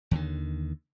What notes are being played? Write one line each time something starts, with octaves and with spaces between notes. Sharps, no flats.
D#2 D3 D#3